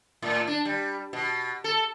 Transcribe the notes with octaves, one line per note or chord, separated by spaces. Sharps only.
A2
D4
G3
B2
A4